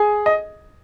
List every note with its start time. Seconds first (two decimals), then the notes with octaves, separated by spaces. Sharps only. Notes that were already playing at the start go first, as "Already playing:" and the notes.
Already playing: G#4 G#5
0.26 D#5